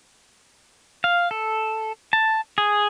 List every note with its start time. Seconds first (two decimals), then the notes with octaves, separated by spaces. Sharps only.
1.04 F5
1.31 A4
2.13 A5
2.58 G#4